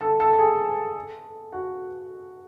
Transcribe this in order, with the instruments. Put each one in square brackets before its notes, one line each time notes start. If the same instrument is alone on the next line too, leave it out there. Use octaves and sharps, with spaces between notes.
[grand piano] A4 A5
A4 A5
A5
G#4 G#5
F#4 F#5